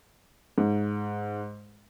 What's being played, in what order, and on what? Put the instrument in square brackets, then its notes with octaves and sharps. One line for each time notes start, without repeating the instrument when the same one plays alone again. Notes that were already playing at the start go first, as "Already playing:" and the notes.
[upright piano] G#2